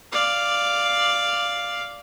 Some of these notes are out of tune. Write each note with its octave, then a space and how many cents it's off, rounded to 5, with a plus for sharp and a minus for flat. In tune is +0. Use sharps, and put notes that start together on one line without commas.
D5 +0 F5 +0